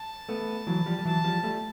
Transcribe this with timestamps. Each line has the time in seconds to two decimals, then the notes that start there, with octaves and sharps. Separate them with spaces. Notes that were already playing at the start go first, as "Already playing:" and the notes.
Already playing: A5
0.29 A3 B3
0.67 E3 F#3
0.86 F3 G3
0.98 G3
1.05 E3 F#3 A5
1.24 F3 G3
1.43 G3 A3